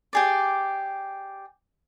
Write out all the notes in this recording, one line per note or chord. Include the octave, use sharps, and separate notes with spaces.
G4 G#4 D5